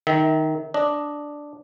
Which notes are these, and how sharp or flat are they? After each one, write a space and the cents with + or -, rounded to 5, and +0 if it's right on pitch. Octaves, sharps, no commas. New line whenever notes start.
D#3 +0 E5 -35
D4 +0 D#5 +0